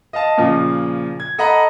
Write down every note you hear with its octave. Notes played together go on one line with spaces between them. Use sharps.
D#5 F5 A5
A#2 C#3 F3
G#6
A4 D#5 F#5 A#5 B5